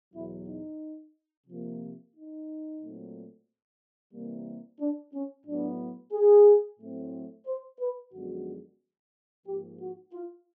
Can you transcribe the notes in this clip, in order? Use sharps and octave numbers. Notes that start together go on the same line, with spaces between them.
E2 B2 F#3 E4
D#4
C3 F3 A#3
D#4
A#2 F#3 A3 C4
C3 E3 G3 A#3
D4
C#4
A2 F#3 B3 D4
G#4
A2 F#3 A3 C4
C5
B4
F#2 D3 F3 G#3 B3 F#4
G#2 F3 A#3 G4
F#4
F4